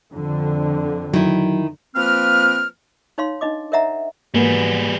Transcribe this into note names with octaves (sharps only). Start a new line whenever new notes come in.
F2 D3
D#3 F#3 E4
F3 A#3 C4 B4 F6
D#4 C#5 F5 C6
D4 D#4 D#5 D6
A#4 C#5 D#5 E5 F#5 A#5
G#2 E3 F#3 G3 A#3 B3 G#4